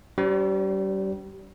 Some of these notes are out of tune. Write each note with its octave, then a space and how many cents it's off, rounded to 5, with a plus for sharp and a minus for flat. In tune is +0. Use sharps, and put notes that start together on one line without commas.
G3 -30 C#4 +40 C5 +0